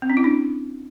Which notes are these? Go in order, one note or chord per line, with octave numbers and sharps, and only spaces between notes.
C4
C#4
E4
D4